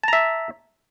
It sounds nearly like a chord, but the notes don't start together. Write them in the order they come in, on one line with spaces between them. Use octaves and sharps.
A5 A#5 E5